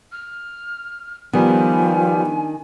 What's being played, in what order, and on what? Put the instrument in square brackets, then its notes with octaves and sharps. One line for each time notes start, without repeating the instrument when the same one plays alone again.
[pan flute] F6
[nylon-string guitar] D#3 [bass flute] F3 [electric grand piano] G3 B3 [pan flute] G#5
[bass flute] D4